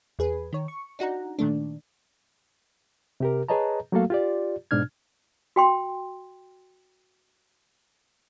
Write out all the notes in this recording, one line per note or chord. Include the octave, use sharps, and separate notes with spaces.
E2 G#4 B4
D#3 C#5
C#6
D4 D#4 F#4 F#5 A#5
A#2 D#3 A3 D4
C3 G4 A#4
G#4 B4 C#5 D#5 A5 A#5
F#3 A3 A#3 F#4 A4 F5
F4 G4 D5
G#2 B2 D4 F6 G#6
F#4 G5 C6